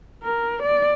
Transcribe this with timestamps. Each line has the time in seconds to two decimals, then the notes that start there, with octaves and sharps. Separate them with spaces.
0.23 A#4
0.63 D5